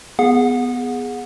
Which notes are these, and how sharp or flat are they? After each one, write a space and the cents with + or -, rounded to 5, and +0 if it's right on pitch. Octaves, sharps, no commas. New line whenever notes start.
B3 +0 G#4 +0 F#5 -30